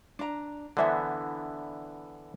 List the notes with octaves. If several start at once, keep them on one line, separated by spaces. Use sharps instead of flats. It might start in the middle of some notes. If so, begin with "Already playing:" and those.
D4 A#5
D3 E3 B3 D4 C5 E5